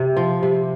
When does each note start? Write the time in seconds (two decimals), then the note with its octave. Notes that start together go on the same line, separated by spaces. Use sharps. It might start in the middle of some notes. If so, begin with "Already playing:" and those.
Already playing: C3
0.17 F3
0.43 C3